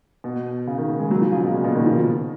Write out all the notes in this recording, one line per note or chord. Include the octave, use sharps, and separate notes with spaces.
B2
C#3
D#3
G#3
F#3
F3
C#3
B2
A#2
B2
D#3
F3